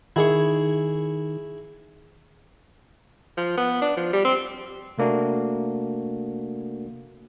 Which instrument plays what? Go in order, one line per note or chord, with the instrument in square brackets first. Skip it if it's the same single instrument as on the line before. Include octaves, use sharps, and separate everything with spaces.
[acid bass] D#3 [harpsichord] E4 G#4 C#6
[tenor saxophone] F3
B3
D4
F3
G3
C4
[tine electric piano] C3 A3 A#3 D4 F#4